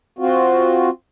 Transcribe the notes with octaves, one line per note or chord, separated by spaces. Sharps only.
C4 F4 F#4